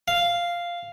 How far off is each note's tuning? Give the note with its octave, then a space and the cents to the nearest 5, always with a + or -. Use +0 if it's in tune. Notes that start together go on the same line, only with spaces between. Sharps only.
F5 -5